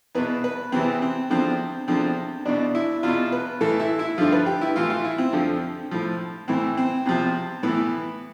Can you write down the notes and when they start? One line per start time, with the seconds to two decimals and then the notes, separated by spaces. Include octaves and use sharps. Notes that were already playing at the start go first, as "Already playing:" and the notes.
0.15 E2 B2 B4
0.44 B4
0.72 E2 C3 E3 C4
1.02 C4
1.30 E2 D3 F3 C4
1.88 E2 D3 F3 C4
2.45 E2 B2 D4
2.75 E4
3.03 E2 B2 F4
3.32 B4
3.61 A2 E3 A4
3.80 E4
3.99 E4
4.18 G2 D3 F3 F4
4.32 B4
4.46 G4
4.61 E4
4.76 A2 E3 F4
4.90 F4
5.04 E4
5.18 C4
5.33 F2 D3 F3
5.91 A2 F3
6.48 A2 E3 C4
6.77 C4
7.05 E2 C3 F3 C4
7.63 A2 E3 B3